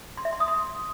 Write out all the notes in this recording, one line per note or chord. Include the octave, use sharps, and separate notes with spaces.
C6
E5
C6
D#6
C6